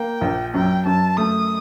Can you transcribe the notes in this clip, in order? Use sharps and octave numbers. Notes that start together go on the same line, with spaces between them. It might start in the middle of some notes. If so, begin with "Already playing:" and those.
Already playing: A#3 G5
A#1
F#2 G5
F#2 A5
A3 D#6